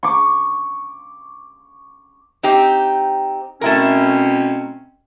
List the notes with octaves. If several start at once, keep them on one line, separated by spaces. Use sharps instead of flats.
C#6 D6
C4 D#4 G4
B2 A3 C4 C#4 E4 A#4